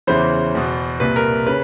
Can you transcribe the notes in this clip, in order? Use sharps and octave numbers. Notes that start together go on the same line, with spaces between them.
E2 C#3 E3 C5
E2 B2
C2 A#2 B4
A#4
C#3 B4